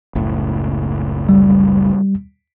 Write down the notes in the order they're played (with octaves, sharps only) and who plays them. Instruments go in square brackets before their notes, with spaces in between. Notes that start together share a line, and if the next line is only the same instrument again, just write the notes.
[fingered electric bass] F#1 C#2 A2
[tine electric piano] G3